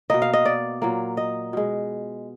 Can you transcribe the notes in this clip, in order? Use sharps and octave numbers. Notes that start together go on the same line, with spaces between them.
B2 A#3 D#5
F5
D#5
D5
A#2 F#3 A#3
D#5
B2 G#3